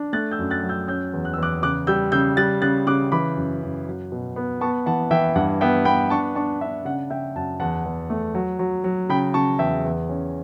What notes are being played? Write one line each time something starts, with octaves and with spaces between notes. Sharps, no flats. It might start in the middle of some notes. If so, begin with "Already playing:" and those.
Already playing: D4
A3 F#6 A6
E6 G6
F#2
F#6 A6
F#3
E6 G6
C#4 E6 G6
E2
F#6
E6
E2 D6 F#6
C#3 D6 F#6
G3 E6 G6
C#3 E6 G6
G3 F#6 A6
C#3 F#6 A6
C#3 D6 F#6
E3 B5 D6
F#2
F#2
F#3
B2
B3
B3 A5 C#6
E3 F#5 A5
E3 E5 G5
G2 F#5
B3 E5 G5
B3 G5 B5
D4 A5 C#6
D4 A5 C#6
D4 E5
C#3 F#5
C#3 E5 G5
F#2 F#5 A5
E2 F#5 A5
E2
A3
F#3
F#3
F#3
C#3 G5 B5
C#3 A5 C#6
E2 E5 G5
E2
C#4